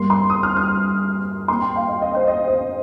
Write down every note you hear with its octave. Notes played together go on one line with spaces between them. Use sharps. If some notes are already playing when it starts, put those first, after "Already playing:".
Already playing: G2 G3 A#3 C6
C6
D#6
F6
F6
A#2 A#3 C6
G5
F5
D#5
D#5
C5
D#5
D#5